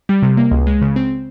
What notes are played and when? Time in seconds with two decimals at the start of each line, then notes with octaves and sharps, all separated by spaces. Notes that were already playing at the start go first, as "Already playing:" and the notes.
0.09 G3
0.23 C3
0.37 A#3
0.51 C#2
0.67 G#3
0.82 C#3
0.96 C4